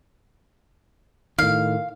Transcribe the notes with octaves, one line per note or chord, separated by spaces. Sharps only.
A2 D#3 F5